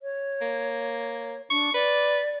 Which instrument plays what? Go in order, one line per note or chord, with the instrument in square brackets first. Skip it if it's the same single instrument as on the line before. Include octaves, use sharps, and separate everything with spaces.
[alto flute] C#5
[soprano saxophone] A#3
[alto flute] D4 [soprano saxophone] C#6
[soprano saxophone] B4 [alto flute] D5